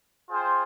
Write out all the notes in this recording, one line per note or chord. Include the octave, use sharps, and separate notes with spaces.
F4 G#4 C5 G5